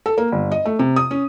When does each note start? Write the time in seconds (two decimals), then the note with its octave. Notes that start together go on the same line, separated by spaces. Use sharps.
0.06 A4
0.18 A#3
0.32 G1
0.52 D#5
0.65 A3
0.79 C3
0.96 D#6
1.11 C#4